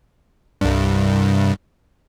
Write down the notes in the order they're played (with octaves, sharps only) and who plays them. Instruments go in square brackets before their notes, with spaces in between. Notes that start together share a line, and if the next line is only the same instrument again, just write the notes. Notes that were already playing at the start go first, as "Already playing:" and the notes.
[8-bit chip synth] C2 G2